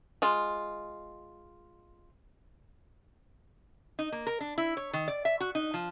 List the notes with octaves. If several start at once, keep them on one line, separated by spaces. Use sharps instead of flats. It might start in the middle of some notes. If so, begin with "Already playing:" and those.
G#3 F4
D#4
A#3
A#4
D4
E4
C#5
D#3
D5
E5
F#4
D#4
F3